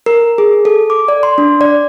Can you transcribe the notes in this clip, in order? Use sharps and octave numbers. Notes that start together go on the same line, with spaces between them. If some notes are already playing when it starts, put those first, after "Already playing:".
A#4
G#4
A4
D6
D5
C6
D4
D5